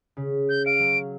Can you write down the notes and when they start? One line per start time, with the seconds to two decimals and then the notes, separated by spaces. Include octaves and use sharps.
0.17 C#3
0.49 G6
0.66 F5 D7
0.80 F#3